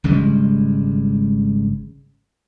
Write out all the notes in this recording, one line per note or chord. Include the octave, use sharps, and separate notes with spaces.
G#1 C#3 G3 G#3